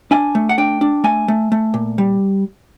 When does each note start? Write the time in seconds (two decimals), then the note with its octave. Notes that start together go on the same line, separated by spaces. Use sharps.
0.11 D4 G#5
0.35 A3
0.49 F#5
0.58 D4 G5
0.81 D4
1.04 A3 G#5
1.28 A3
1.52 A3
1.74 A#2
1.98 G3